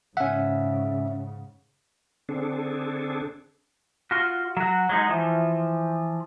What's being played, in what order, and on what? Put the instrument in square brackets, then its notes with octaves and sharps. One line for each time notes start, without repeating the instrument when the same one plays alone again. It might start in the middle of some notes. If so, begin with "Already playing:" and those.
[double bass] G#2 C#3 [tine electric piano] C#4 E5 [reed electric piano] F#5
[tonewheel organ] D3 C4 D4 G#4 A4
[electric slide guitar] F4 F#4
F#3 F#4
F#3 G#3 D#4
E3 F3